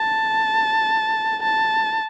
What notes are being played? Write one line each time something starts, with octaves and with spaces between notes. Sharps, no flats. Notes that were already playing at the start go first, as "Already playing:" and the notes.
Already playing: A5
A5